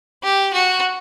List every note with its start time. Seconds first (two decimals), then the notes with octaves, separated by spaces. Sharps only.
0.24 G4
0.54 F#4